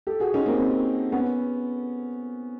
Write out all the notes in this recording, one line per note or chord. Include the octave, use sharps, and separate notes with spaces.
G4 A4
F#4 G#4
C#4 D#4
A#3 C4
B3 C#4